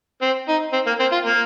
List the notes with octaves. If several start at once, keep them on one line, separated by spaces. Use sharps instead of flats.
C4
D#4
C4
A#3
C4
F4
A#3